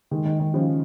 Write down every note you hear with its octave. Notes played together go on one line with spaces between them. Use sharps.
D#3 G#3
D#3
D#3
C#3 F3